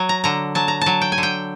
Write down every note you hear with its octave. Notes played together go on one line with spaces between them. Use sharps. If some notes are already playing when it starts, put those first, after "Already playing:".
Already playing: F#3
A#5
D3 A#5
F#3 A5
A#5
F#3 A5
G5
G#5
D3
G5